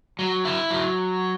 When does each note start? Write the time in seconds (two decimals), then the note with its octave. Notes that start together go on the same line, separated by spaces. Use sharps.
0.19 F#3
0.45 E4
0.71 F#3